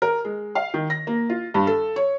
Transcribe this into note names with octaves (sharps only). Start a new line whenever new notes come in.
A#4
G#3
F5
D#3
A#6
A#3
F4
G2
A4
C#5